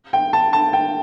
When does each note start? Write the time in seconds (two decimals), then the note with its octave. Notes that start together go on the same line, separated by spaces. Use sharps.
0.13 G5
0.33 A5
0.53 A5
0.73 G5